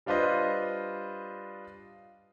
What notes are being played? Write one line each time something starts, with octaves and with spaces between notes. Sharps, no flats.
G3 D4 F4 B4 C5 D#5